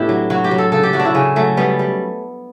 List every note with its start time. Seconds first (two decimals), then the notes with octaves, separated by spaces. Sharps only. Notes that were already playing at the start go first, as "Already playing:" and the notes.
Already playing: A2 B3 D4 E4 G4
0.09 F#3
0.30 F#3 F#4
0.44 G4
0.51 F#3
0.58 A4
0.72 C#3 A4
0.83 G4
0.93 F#3 F#4
1.00 D4
1.05 E4
1.14 C#3 C#4
1.36 F#3 A3
1.57 G3 B3
1.79 G3